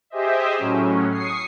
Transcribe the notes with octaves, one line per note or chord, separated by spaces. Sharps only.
G4 G#4 C5 D#5 E5
A2 F#3 C#4
C#6 D#6 C7